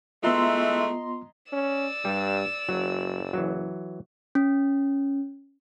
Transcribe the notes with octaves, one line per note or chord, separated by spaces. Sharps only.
E3 G#3 A3 B3 F4 D#5 A#5 C6
C#4 D5 E6
G2 G3
F#1 F#3
E3 F#3
C#4